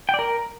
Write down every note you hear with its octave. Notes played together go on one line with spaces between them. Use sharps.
G5
D5
A#4